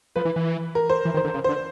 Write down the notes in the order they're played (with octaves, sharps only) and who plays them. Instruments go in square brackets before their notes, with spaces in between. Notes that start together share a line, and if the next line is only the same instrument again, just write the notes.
[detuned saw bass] F3 [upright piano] B4
[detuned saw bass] E3
E3
[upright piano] A#4
C5
[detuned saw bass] E3
D#3
[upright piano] C5
[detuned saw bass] D3
C#3
[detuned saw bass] D3 [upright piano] C5